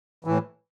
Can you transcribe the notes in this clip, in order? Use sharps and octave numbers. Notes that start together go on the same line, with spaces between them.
A2 E3